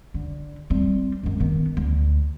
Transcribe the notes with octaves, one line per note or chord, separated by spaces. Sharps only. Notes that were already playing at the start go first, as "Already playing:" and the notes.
D3
G3 C4
F#2 G#3
D#3 B3
D2